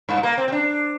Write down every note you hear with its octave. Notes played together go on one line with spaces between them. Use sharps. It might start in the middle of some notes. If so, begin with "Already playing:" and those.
G2
A#3
C4
C4
D4